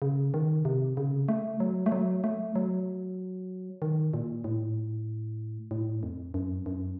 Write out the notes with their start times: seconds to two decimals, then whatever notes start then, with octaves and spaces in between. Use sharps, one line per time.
0.02 C#3
0.34 D#3
0.65 C3
0.97 C#3
1.28 A3
1.60 F#3
1.86 A3
1.92 F#3
2.24 A3
2.55 F#3
3.82 D#3
4.14 A#2
4.44 A2
5.71 A2
6.03 F2
6.34 F#2
6.66 F#2